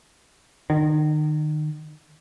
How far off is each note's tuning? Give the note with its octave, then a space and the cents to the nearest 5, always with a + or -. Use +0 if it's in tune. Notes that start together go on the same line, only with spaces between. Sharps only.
D#3 -35